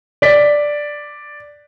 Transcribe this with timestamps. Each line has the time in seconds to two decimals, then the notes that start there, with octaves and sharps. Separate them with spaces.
0.22 D5 B6